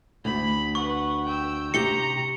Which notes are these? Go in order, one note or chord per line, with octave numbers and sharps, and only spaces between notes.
D2 B5
B4 F#5 C#6
G5 E6
C3 G4 A#5 C#7 G7